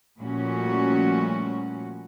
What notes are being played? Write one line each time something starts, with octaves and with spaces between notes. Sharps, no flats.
A#2 F3 G3 A3 C#4 F#4